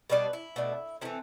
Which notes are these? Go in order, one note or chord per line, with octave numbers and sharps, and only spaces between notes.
B2 G3 D4 B4
E4
B2 A3 D4
E3 A3 C4 E4